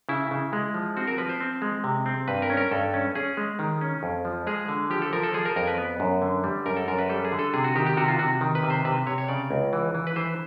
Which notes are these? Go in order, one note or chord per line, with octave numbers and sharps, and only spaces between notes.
C#3 E4
C#3
G#3
F3
C4 F#4
A#4
F3 B4
C5
C4
G#3
C3
C4
G2 B4
A#4
C#4
A#4
G2 A4
C#4
C#4 G#4
G#3
D#3
C#4
F2
F3
G#3 G#4
D3
F3 G4
A4
F3 A#4
A4
F3 G#4
A#4
F2 A#4
B4
B3
F#2
D3
G3
F#2 A#4
A4
F#2 A#4
B4
G3 A4
G#4
D3
A4
C3 G#4
F#4
D#3 G4
G4
C3 F#4
F4
C3 F#4
D#3
B4
C3
C5
C3 B4
C3 C#5
C#5
C#3 D5
C#2
E3
E3
B4
E3 C5